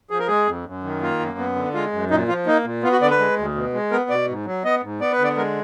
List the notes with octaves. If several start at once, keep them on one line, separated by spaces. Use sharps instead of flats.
F3 G#4
A#4
G#3 G#4
F2
F#2
D#3
A#3 F4
F#2
B3
D3
G#3 F4
F#2
A#2 D#4
F3 F4
A#3 D#4
A#2
B3 F4
F#4
D3 D5
B4
G#3
D2
B2
G#3
B3 A#4
B2 D5
G#2
F#3
B3 D#5
G#2
B3 D5
B4
D3
D5
G#3 A#4